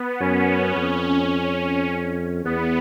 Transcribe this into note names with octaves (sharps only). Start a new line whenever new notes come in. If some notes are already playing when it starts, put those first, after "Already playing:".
Already playing: B3
F#2 C#4
F2
E2 B3